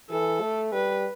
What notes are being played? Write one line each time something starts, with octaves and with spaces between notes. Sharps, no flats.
E3 A4
A3
G3 B4